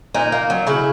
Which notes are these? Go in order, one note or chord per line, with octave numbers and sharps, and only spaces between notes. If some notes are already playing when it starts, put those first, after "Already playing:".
A#2 D#4
A#3
F#3
C#3 E4